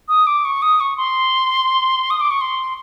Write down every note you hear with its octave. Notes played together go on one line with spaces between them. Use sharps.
D#6
D6
C#6
D#6
C#6
C6
D#6
D6
C#6
C6